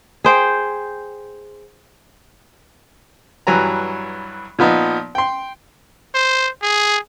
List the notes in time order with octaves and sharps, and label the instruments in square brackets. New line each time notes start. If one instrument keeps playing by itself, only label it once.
[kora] G#4 C5 G5
[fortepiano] G2 E3 F#3 G#5 A#5
A#2 F3 B3 D#4
G5 C6
[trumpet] C5
G#4